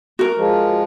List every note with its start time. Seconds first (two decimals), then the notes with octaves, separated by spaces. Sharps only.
0.19 F#4 A#4
0.37 F3 G#3